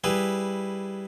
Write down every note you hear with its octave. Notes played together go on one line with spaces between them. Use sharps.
G3 E4 G#4 B4